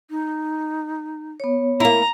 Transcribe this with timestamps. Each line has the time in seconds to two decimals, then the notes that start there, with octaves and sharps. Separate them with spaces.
0.10 D#4
1.40 B3 C#5
1.80 A#3 E4 A#5